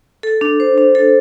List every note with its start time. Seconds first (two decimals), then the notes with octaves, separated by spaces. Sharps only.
0.23 A4
0.41 D4
0.60 C5
0.78 D4
0.95 A4